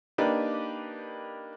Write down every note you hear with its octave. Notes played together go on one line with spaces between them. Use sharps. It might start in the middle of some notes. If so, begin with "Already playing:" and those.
A#3 D4 D#4 G4 B4